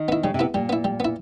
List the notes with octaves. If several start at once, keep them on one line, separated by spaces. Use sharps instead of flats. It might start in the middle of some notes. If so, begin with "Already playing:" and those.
Already playing: D#3
B3 E4
C#3 G3
C3
B3 E4
A#2 G3
B3 E4
G3
B3 E4